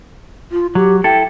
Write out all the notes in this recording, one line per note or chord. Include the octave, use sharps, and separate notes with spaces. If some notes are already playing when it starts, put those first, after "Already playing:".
F4
F#3 G4
E4 A4 G5